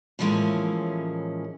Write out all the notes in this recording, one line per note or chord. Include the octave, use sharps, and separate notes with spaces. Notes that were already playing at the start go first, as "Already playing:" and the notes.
A2 E3 F3 G#3 A#3 C#4